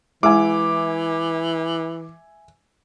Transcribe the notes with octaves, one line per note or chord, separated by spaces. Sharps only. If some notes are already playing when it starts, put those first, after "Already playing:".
E3 G#3 E4 G#4 E5 G#5 D6